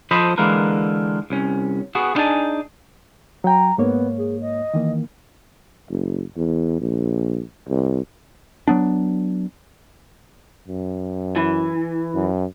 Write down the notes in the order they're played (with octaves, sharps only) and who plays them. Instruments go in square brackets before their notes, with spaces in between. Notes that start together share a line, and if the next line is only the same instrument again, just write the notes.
[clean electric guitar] F3 A4 C5 D#5 A5 B5
D3 E3 G#3 A#3 A#4 B4
C2 C#4
B3 F#4 G#4
B3 D4 D#4 G#4 G#5 A5
[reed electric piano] F#3 G5 [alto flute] A#5
[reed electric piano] G#2 A#3 C#5 [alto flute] B3
[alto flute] G#4
D#5
[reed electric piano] D#3 E3 A#3
[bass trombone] F#1
E2
A#1
C2
[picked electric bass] F#3 B3 D4
[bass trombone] F#2
[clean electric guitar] E3
[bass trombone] F#2